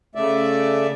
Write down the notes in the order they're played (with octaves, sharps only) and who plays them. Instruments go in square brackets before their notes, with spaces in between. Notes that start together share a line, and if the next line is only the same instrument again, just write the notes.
[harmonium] C#3 A3 D5 E5